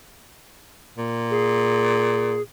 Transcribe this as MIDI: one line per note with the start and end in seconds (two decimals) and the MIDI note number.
0.98 2.39 46
1.31 2.42 68